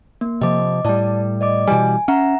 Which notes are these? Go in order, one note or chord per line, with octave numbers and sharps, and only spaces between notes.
A#3
C3 F3 D#5 D6
A2 G3 D5 A5
D5 D#5 D6
B2 E3 G3 G#5
C#4 E5 F#5 A#5